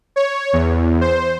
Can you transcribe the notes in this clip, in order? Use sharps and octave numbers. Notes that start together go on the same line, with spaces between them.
C#5
E2
C5